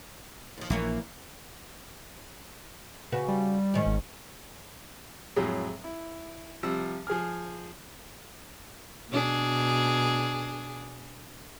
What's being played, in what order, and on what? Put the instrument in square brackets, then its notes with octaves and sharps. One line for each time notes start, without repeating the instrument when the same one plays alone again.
[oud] D#2 F3
[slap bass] A#1 [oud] E3 A#3 C#5
[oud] C#3 F#4 B4
[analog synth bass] G3
[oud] G#2 D#3 C#4
[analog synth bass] G#1
[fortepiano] F2 A2 F#3 G#3
E4
C3 F3 G3 E6
F3 G#4 G#5 F6
[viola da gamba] B2 D4 G#4